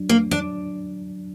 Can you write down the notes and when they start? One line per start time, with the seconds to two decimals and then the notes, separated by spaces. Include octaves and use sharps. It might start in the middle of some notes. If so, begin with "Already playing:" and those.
Already playing: F#3 D4
0.09 A#3
0.31 D4